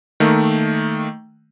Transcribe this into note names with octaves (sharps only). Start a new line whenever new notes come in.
D#3 A3 A#3